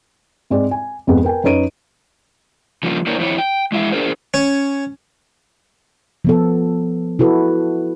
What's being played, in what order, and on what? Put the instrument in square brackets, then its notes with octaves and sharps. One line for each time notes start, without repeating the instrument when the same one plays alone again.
[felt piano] G#2 G#3 C4 D5
G#5
F2 G#2 G#3 B3
A#4 B4 G5 G#5
F#2 D#4 B4 C#5 D7 D#7
[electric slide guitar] C#3 F3 G3 A#3 C#4 D#4
A#3 D4 E4 A#4 C5 C#5
F2 A3 C4 E4 C#5
G5
G#3 E4 E5 F5
D4 G#4 A#4 C5
[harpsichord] C#4
[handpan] F3 B3 A4
E4 F#4 A4 B4